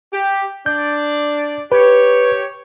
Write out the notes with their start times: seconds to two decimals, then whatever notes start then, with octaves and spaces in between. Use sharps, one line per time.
0.12 G4
0.66 D4 D5 G6
1.72 G4 B4 C#5